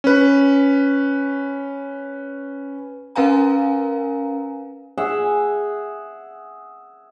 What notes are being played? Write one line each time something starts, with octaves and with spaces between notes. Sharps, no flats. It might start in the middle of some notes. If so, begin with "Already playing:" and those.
C#4 B4
C#4 A#4 B4 F5 G#5 A#5
G#4 E5 F#5